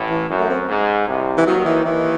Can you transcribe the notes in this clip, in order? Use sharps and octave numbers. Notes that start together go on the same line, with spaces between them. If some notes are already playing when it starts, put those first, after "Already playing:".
Already playing: A1 A2
E3
F#2
A3
C4
G#2
C2 C3
E3
D#2 D#3 F#3
E3
D#2 D#3 E3